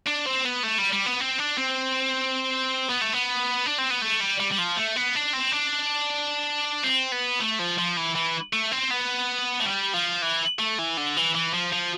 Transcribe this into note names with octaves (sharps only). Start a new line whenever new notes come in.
D4
C4
B3
A3
G3
G3
B3
C4
D4
C4
B3
A3
B3
D4
C4
B3
A3
G3
G3
G3
F3
A3
B3
D4
C4
D4
C4
B3
A3
F3
F3
E3
E3
A3
C4
B3
A3
G3
F3
E3
A3
E3
D3
E3
E3
F3
F3